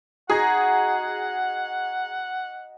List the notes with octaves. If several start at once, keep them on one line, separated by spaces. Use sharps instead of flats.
D#4 F#4 G#4 D#5 F#5